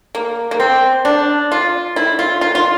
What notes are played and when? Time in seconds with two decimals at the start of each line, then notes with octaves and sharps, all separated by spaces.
0.15 A#3
0.51 A#3
0.60 C4
1.05 D4
1.52 F4
1.96 E4
2.19 F4
2.41 F4
2.55 F4